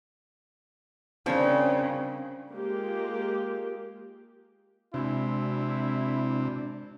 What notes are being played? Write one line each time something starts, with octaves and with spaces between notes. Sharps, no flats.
C#3 F3 G3 C4 D4 A#4 G5
G#3 A#3 F4 G4
C3 G#3 C4 D4 E4 F#4